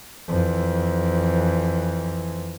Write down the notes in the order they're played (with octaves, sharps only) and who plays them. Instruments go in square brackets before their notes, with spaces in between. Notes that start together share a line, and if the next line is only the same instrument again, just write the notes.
[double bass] F2 E3